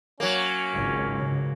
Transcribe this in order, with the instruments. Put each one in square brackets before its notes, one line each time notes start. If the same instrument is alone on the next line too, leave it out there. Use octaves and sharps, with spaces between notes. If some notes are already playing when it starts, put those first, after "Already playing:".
[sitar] F#3 A#3 [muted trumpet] C#4
[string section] G#1 C#2
[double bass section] C#3